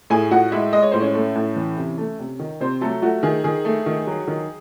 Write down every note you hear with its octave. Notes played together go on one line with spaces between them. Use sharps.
A2 G#4 G#5
A2 F#4 F#5
G#3 E4 E5
G#3 D#5
C#5
A2 C5
C#4 C#5
A3
A2
E3
C3
A3
C3
D#3
C3 C4 C5
F#3 A3 A4
A3 F#4
D#3 G#4
D#3 G#4
A3
D#3
F#3
D#3